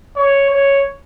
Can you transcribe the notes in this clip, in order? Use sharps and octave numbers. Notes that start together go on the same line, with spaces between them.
C#5
C#5